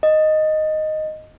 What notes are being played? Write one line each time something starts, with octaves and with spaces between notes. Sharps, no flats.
D#5